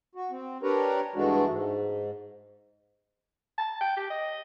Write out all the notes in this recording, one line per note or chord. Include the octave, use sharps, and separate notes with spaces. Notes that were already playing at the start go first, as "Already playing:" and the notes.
F#4
C4
D4 G4 A#4 B4 C#5 A#5
G2 E3 G#3 A3 D4 F#4
G#2
A5
G5
G4
D#5